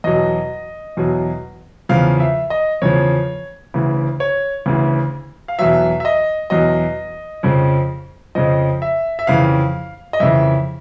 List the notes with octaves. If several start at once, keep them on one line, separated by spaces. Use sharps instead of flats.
E2 B2 F#3 D#5
E2 B2 F#3
E2 C#3 F3 F5
E5
D#5
E2 C#3 F3 C#5
D2 C#3 E3
C#5
D2 C#3 E3
F5
E2 B2 F#3 E5
E5
D#5
E2 B2 F#3 D#5
F2 C#3 F3
F2 C#3 F3 D#5
E5
E5
F2 C#3 E3 F5
D#5
F2 C#3 E3 E5